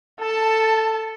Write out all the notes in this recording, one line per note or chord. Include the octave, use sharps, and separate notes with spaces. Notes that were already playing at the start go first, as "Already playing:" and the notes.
A4 A5